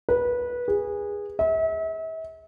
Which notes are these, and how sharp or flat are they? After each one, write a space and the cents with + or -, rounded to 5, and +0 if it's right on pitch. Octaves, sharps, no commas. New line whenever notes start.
B4 -20
G#4 -20
E5 -40